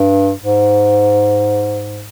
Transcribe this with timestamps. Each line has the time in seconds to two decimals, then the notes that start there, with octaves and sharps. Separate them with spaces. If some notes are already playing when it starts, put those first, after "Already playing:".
Already playing: G2
0.39 G#2